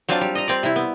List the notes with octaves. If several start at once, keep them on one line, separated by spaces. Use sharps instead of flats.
F#3 C4 D4 F4 F5
G3
D#5 A#5
C4 D5
C3 E4
B3